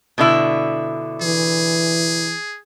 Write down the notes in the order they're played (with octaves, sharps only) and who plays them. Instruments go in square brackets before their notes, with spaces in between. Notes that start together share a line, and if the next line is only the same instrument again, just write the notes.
[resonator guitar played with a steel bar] B2 D3 E4
[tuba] E3 [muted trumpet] G#4